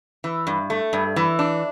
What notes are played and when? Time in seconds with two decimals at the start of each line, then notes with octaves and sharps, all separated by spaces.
0.24 E3
0.47 G2
0.70 A3
0.93 G2
1.16 E3
1.39 D4